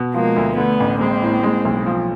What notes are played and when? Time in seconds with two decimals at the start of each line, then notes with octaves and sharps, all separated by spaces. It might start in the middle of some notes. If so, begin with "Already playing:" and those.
Already playing: B2
0.14 F3 G#3 A#3
0.36 D2
0.57 D3 A3 B3
0.80 A1
1.01 G#3 A#3 C4
1.22 A2
1.43 G#3
1.65 B1
1.86 F3